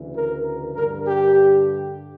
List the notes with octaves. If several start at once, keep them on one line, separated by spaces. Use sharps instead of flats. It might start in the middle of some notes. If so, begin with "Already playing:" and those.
Already playing: D2 C#3 E3
A#4
G2 D3 A#4
G4